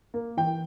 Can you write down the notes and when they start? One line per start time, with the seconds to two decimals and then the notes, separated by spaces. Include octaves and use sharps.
0.14 A#3
0.37 E3 G5